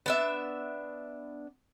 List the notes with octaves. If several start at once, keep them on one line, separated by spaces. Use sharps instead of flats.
B3 D4 E5